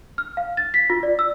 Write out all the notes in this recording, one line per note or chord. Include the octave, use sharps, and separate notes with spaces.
F6
F5
A6
B6
F4
D5
E6